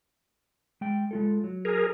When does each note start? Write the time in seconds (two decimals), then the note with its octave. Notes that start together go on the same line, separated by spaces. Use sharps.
0.81 G#3 G5
1.11 G#3 F4 A4
1.44 F#3
1.65 G#4 A#4